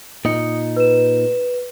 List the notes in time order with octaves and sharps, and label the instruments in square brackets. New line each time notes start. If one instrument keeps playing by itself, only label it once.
[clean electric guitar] A#2 D#4 [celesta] D#6 C#7
[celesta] B4 E7